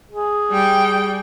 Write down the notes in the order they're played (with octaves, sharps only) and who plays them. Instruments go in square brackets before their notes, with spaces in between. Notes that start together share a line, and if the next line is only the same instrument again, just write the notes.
[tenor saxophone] G#4
[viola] G3 G5